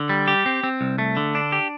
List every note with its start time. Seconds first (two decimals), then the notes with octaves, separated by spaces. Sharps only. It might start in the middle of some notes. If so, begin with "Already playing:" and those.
Already playing: D3
0.09 G3
0.28 G4
0.46 C4
0.63 C4
0.81 C2
0.98 A3
1.17 D3
1.35 D4
1.52 G4